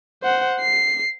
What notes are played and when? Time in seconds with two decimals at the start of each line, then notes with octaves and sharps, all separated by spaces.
0.23 C5 F#5
0.60 C7